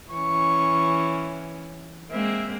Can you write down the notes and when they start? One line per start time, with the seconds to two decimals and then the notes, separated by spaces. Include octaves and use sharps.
0.11 E3 C#4 C#6
2.11 G#3 A#3 C4 E5